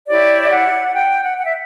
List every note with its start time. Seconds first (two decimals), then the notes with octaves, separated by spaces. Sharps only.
0.06 E4 G4 C#5 D5
0.43 E5
0.50 F#5
0.94 G5
1.23 F#5
1.38 F#5
1.45 E5